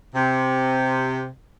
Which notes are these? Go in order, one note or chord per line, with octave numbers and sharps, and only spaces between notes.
C3